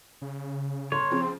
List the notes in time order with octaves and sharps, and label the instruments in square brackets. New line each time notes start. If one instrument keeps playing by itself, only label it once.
[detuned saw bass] C#3
[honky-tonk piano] G1 [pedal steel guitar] C#5 [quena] C6
[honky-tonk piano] C#3 F3 [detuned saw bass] C4